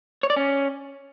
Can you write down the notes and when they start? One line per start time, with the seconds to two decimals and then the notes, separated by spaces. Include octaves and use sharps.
0.23 C#5
0.30 D5
0.36 C#4